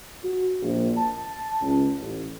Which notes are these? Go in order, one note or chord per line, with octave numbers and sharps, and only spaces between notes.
F#4
A#1
A5
C#2
A1